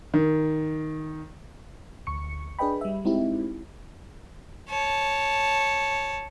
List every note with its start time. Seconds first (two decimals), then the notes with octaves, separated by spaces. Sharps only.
0.14 D#3
2.07 D2 C#6 C#7
2.59 D4 G#4 B4 D#5 G5 B5
2.81 G3 E5
3.05 G#3 C4 D#4 E4 G4
4.70 C#5 A5